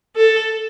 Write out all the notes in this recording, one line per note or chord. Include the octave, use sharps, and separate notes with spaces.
A4